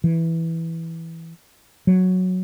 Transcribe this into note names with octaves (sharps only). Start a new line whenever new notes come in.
E3
F#3